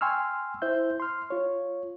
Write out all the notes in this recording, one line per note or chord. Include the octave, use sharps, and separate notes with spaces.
G5 G#5 C6 C#6 E6 F6
E4 C5 E5 G6
C6 F6
F4 C#5